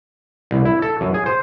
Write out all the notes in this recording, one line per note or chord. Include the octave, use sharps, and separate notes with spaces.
C2
E4
A4
F#2
G#4
C5